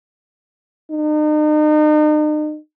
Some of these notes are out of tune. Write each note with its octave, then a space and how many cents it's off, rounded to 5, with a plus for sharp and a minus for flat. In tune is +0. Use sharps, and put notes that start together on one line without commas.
D#4 -40